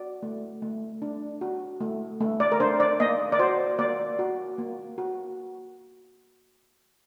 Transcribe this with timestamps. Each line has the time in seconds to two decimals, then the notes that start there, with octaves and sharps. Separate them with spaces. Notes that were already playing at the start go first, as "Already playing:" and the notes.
Already playing: F#4 D5
0.23 A3
0.62 A3
1.02 D4
1.41 F#4
1.80 A3
2.20 A3
2.40 D5
2.52 A#4
2.60 D4 C5
2.80 D5
3.00 A#3 D#5
3.32 D5
3.39 F#4 C5
3.79 A#3 D5
4.19 F#4
4.58 A#3
4.98 F#4